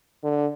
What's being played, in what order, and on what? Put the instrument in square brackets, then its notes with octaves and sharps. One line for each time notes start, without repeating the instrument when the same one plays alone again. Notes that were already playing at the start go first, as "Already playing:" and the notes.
[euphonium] D3